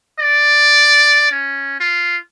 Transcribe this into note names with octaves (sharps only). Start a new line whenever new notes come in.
D5
C#4
F4